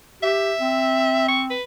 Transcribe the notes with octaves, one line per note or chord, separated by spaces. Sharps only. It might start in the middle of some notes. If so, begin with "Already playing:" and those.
G4 E5
C4
C#6
B4